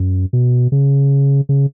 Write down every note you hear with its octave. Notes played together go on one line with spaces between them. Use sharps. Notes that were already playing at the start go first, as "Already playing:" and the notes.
Already playing: F#2
B2
C#3
C#3